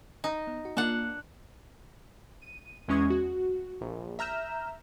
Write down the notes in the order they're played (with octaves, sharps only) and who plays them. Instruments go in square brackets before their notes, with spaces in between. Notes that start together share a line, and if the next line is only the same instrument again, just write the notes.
[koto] D#4
[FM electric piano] B3
F#4
[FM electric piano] A#3 F4 [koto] D4 F#5
[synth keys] D#7
E2 G#3 C#4 C#6 D#6 G#6
F#4
A#1
E5 A#5 F6 G6 E7